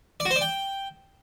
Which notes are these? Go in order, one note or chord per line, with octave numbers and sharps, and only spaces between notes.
D5
F#4
C5
D5
G5